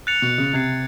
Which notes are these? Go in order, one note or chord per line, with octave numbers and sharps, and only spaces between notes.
F#6 A6 C#7 F7
B2
C#3
C3 G#6 C7 F7